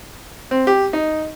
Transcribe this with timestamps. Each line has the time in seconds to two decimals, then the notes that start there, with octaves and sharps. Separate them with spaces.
0.51 C4
0.67 G4
0.93 D#4